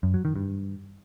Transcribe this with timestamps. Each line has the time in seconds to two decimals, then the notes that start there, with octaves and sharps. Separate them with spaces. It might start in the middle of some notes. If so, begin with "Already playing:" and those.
0.03 F#2
0.14 F#3
0.25 D#3
0.36 G2